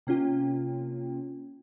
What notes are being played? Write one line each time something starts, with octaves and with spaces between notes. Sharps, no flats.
C3 A#3 C#4 F4 G5